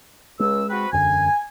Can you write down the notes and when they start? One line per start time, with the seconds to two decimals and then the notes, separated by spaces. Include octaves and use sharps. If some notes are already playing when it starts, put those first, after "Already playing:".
0.40 C#2 G#3 E6
0.70 C4 F#4 B4
0.92 E1 F#2 D3 G#5